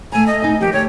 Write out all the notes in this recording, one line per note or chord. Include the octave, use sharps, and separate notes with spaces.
A3 G#5 A#5
D#5
D#4 G#5
F3 A#3 G4
D2 C#5